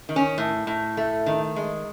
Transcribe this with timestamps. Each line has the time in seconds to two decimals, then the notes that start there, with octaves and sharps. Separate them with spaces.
0.09 D#3
0.16 C#4
0.38 A2
0.67 A2
0.97 A3
1.26 D#3
1.56 G#3